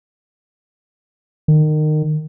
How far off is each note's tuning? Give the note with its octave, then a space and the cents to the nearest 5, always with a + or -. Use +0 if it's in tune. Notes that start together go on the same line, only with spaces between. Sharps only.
D#3 -25